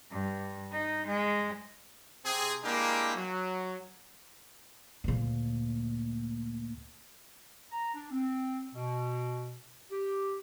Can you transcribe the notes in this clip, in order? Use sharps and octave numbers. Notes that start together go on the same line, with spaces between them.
G2
D#4
G#3
C3 C4 G#4
G#3 A#3 D4 E4 G4 A#4
F#3
D2 A#2
A#5
D4
C4
B2
G4